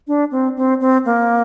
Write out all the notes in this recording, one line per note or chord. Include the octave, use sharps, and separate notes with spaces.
D4
C4
C4
C4
A#3